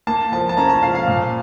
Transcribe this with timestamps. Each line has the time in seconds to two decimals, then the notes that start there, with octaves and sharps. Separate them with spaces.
0.07 A#3 A5
0.32 F3 A5
0.49 A5
0.57 C#4 A#5
0.69 A5
0.82 F3 F5
0.95 F5
1.08 A#2